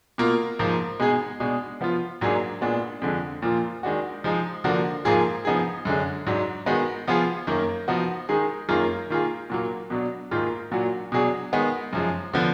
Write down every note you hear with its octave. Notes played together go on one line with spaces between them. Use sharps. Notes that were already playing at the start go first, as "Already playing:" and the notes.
B2 A#3 F4
G#2 F3 A#3
B2 G#3 D#4 G#4
B2 G#3 D4
F3 B3 F4
G#2 F#3 A#3 D4 G#4
A#2 G#3 B3 D4
F2 D3 G#3
A#2 F3 A#3 F4
D#3 G#3 D4 F#4
F3 G#3 D#4
D3 F3 A#3 D4 F#4
G#2 F3 A#3 F4 G#4
F3 B3 D#4 G#4
F#2 D3 G#3
G#2 F#3 D4
D#3 G#3 B3 D#4 F#4
F3 B3 F4 G#4
F#2 D#3 A#3
F3 B3 D#4 F#4
D#3 G#3 D#4 G#4
F#2 D#3 A#3 F4 G#4
D#3 A#3 F4 G#4
A#2 F#3 A#3
B2 F#3 D4
G#2 D#3 A#3 F4 G#4
A#2 F#3 D4 F#4
B2 F#3 D4 G#4
D#3 G#3 B3
F#2 F3 G#3
D3 F3 B3